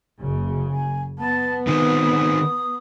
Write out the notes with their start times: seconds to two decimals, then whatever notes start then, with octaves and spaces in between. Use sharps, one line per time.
0.20 F#1 C#3
0.71 G#5
1.19 B3 A5
1.67 D#3 C4 D#4 D#6